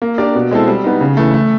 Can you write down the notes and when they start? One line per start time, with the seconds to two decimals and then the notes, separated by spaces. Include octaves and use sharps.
0.02 A#3
0.18 D4 G4 A#4 D5
0.35 B2
0.51 G#3 C4 E4 A4
0.68 G3
0.84 B3 D#4
1.01 C#3
1.17 E3 A3
1.34 A3